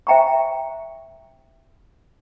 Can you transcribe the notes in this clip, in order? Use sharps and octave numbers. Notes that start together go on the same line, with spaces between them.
C5 E5 G5 A#5 C#6